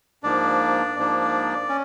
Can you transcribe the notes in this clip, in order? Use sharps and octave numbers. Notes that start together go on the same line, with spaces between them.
G#2 F3 A#3 D4 D5
G#2 F3 A#3 D4
C#4